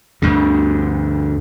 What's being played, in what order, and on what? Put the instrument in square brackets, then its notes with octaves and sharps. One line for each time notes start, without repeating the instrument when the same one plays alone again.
[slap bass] D2 G2 D3